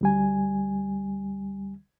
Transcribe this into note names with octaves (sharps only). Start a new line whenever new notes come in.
D2 G3 G#5